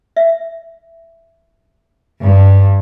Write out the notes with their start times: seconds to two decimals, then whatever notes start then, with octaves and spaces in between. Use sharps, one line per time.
0.16 E5
2.23 G2